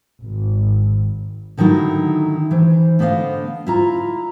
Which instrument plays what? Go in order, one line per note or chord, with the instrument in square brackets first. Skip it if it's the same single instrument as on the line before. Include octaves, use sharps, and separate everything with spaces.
[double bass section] G#1
[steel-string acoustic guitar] D3 D#3 F#3 D#4 E4
E3 C5
D3 B3 C5 D#5 F5
E4 F4 A#5